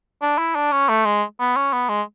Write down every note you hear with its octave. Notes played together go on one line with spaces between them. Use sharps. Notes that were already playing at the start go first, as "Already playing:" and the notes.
D4
E4
D4
C#4
A3
G#3
B3
C#4
B3
G#3